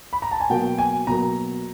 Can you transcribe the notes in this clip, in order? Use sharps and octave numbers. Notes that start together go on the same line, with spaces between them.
B5
A#5
A5
G#5
B2 F#3 A#3 G5
G#5
B2 F#3 A#3 A#5